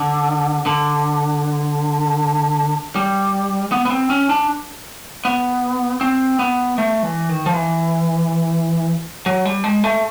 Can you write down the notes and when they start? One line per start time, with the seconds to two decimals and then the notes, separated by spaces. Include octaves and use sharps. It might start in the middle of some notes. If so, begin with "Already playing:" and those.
Already playing: D3
0.66 D3
2.95 G3
3.72 B3
3.85 B3
3.90 C4
4.10 C#4
4.29 D4
5.25 B3
6.01 C4
6.39 B3
6.78 A3
7.03 E3
7.29 D#3
7.46 F3
7.53 E3
9.26 F#3
9.45 G3
9.64 G#3
9.84 A3